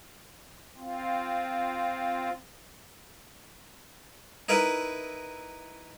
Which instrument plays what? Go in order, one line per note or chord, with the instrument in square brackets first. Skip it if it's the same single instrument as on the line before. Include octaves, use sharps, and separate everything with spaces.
[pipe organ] C4 F4
[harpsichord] D#4 E4 A#4 B4